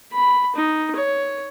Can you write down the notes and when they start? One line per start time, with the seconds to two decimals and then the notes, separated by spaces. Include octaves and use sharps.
0.13 B5
0.56 D#4
0.96 C#5